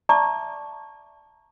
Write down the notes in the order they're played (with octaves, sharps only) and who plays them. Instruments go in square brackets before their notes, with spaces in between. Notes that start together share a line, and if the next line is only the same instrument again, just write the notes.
[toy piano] D5 E5 A5 A#5 C#6 D6